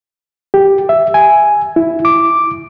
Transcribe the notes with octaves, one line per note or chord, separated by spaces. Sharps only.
G4
E5
G#5
E4
D6